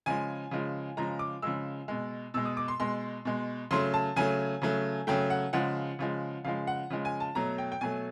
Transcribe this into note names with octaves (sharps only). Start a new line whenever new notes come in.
C#3 F3 G#3 G#5
C#3 F3 G#3
C#3 F3 G#3 A#5
D6
C#3 F3 G#3 E6
B2 G#3
B2 G#3 E6
D#6
D6
C6
B2 G#3 C6
B2 G#3
C#3 F#3 A3 C6
A5
C#3 F#3 A3 G#5
C#3 F#3 A3
C#3 F#3 A3 G5
F#5
C#3 F3 G#3 F#5
C#3 F3 G#3
C#3 F3 G#3 F5
F#5
C#3 F3 G#3
G#5
A5
B2 F#3 A3 A#5
G5
G5
B2 F#3 A3 G#5